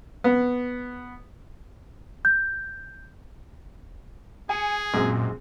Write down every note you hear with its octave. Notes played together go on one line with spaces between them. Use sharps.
B3
G6
G#4 G#5 C#7
F#2 A#2 G#3 C4